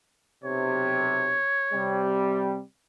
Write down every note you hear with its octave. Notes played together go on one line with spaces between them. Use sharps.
B1 C3 C#5
C3 G3